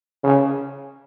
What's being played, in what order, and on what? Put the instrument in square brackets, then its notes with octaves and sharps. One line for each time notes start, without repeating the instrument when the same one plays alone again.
[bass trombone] C#3